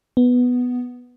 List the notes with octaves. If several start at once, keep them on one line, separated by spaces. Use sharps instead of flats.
B3